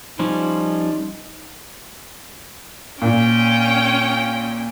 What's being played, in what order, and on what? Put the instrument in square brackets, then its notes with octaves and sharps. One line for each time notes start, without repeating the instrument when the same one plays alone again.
[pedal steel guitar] F3 G3 C#4 [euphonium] D#4
[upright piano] A#2 [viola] C#4 G5